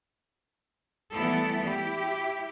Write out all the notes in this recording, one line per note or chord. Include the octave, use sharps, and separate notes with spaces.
E3 G3 A3 B3 E4 A4
E4 G4